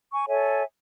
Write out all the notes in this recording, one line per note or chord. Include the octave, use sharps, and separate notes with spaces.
G#5 C#6
A4 C#5 E5 G#5